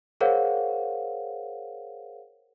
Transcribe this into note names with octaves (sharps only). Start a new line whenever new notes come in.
G#4 A#4 C5 C#5 F5 F#5